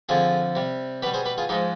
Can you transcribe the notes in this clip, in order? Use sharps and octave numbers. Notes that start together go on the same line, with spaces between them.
F2 D3 F3 F4 G#4
C3 G3
B2 G3 G4 B4
G#4 C5
G4 B4
F4 G#4
G#2 F3 G#3 D#4 G4